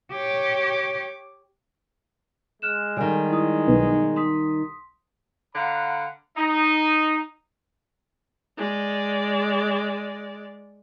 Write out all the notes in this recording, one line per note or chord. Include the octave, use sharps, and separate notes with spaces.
G4 C#5 D6
G#3 F6 F#6 E7
D#3 G3 A4 G#5
E4 D#6
B1
C6 D#6 B6
D3 D5 F5 F#5 A#5 B5
D#4
G#3 D5